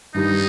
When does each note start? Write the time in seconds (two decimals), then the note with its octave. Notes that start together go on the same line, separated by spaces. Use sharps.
0.14 G2 D#3 G3 D#4